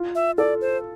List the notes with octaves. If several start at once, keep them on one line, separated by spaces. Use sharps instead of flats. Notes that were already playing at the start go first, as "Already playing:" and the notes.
Already playing: F4
E5
A4 D5
C5